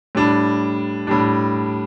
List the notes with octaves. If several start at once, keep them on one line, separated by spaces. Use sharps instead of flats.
A2 G3 D4
A2 G3 D4